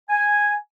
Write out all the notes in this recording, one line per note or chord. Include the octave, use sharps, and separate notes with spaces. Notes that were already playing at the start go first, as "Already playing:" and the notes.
G#5